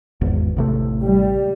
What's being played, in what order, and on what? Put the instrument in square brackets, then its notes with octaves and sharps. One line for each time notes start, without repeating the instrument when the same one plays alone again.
[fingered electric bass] G#1 E2
A1 C3 A3
[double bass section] G3